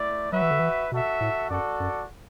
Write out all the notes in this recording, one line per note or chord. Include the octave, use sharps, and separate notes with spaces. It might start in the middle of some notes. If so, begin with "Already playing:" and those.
Already playing: A3 E4 D5
F#3 F#4 B4 E5
E3
D3
E3
B2 F#4 A4 E5
A2
F#2 F#4 A4 D5
F#2